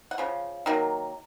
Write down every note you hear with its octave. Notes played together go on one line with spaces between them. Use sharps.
F#5
C#3 F3
D#3 F#3 A#3